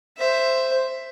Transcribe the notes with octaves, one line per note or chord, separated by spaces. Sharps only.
C5 E5